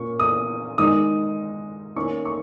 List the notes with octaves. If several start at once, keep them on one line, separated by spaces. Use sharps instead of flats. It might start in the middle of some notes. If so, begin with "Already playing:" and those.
Already playing: A#2 A#3 C#4 C#6
D#6
D#3 G#3 D#4 D#6
D#3 A#3 C#4 C#6
C#6